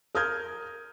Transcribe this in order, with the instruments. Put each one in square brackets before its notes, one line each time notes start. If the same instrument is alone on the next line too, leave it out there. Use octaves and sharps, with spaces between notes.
[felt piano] A#4 D#6 F6 G6 G#6